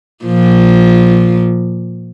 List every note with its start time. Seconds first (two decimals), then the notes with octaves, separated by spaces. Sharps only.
0.25 A#2 F3